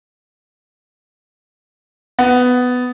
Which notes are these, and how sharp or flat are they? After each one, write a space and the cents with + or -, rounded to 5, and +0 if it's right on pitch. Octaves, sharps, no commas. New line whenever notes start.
B3 +10